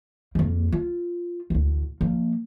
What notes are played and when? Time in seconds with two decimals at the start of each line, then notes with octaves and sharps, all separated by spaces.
0.35 F2 A#3
0.72 F4
1.50 A1 D2
2.01 F3 A#3